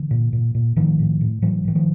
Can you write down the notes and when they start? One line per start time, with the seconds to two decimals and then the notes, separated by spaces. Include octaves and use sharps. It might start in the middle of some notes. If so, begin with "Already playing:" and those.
Already playing: D3 E3
0.11 A#2
0.33 A#2
0.55 A#2
0.76 A2 D#3 F3
0.99 A2
1.21 A2
1.42 A2 E3 F#3
1.65 A2 E3
1.75 D#3 F3